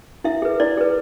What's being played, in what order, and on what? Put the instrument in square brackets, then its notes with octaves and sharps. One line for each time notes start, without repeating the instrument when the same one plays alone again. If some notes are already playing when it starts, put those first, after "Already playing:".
[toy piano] E4 E5
G#4 B4
E4 D5
G#4 B4